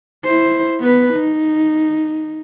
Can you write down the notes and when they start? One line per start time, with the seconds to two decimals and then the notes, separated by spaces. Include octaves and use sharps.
0.25 E4 C5
0.81 B3 B4
1.13 D#4